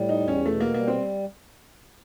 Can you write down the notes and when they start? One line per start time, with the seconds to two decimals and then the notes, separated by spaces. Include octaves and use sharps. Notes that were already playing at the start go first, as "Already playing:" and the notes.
Already playing: A2 G3
0.09 D#4
0.19 E2
0.28 C#4
0.46 B2 A3
0.60 A#3
0.74 G3 A#3
0.88 C4